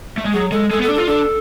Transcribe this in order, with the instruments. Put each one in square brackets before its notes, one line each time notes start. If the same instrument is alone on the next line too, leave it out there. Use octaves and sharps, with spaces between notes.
[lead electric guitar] A3
G#3
[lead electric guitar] F#3 [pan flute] G#4
[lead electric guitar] G#3 [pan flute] A4
[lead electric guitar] G#3 [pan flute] A4
[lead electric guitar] B3
[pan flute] A4
[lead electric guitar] D4
[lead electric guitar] F4 [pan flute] A4
[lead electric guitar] D4 [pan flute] A4